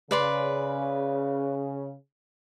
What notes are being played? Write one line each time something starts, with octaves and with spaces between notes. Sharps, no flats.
C#3 B4 D5 C6